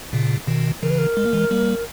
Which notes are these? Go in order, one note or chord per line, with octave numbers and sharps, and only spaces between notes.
A#2 C#3
B2 D#3
C#3 E3 A#4
B4
A#4
G#3
A#3
E3 G#3
G3 A#3